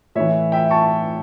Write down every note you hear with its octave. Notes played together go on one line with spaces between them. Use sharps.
A2 E3 C#5 E5
E5 G5
A5 C#6